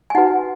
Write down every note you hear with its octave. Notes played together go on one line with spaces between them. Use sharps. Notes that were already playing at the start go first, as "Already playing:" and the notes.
G#5
D#4 F#4 B4 F#5